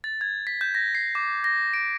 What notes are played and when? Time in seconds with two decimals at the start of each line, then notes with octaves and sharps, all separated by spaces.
0.04 A6
0.21 G#6
0.47 B6
0.61 G6
0.75 A#6
0.95 C7
1.15 D6
1.44 A#6
1.74 D7